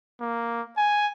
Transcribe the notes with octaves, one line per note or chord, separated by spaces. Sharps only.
A#3
G#5